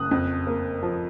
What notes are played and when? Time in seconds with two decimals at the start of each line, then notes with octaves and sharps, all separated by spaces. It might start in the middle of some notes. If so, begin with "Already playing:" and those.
Already playing: F#1 D#6 F#6
0.11 F2
0.47 A#3
0.83 F3